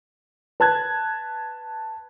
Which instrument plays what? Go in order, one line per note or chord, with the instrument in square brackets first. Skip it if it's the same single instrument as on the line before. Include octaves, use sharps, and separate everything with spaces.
[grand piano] B4 A5 F#6 G#6